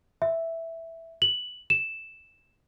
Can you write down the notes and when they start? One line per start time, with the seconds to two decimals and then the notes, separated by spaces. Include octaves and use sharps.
0.22 E5
1.22 F#7
1.70 E7